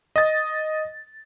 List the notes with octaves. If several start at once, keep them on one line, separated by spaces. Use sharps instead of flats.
D#5 A6